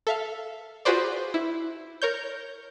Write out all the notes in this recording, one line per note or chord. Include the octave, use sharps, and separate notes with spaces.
A4 E5 F5
F4 F#4 G#4 B4 C5 D5
E4
A#4 C#5 G6